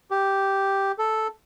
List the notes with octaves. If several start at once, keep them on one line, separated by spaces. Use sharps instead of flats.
G4
A4